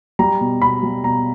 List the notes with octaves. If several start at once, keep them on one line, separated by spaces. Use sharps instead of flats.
G3 A#5
B2
B2 B5
G3
B2 A#5